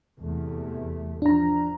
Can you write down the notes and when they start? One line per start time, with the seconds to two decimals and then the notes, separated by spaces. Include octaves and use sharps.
0.19 E2 C3 A3
1.22 F3 D4 A#5